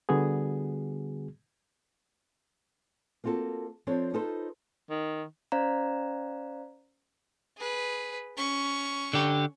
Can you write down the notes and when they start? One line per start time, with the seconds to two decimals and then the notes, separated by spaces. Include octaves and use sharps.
0.09 D3 G3 B3 F#4 G#4
3.24 A#3 C4 F4 F#4 A4
3.87 F3 C4 D4 A4 C#5
4.14 D#4 F4 A4 B4 C5
4.90 D#3
5.52 C#4 C5 D5 F5 A#5
7.57 G#4 B4
8.37 C#4 C#6
9.13 D3 G4